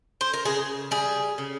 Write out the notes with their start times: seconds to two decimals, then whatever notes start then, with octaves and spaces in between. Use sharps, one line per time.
0.21 C5
0.34 A#4
0.45 C#3 G#4
0.91 G3 G#4
1.38 C#3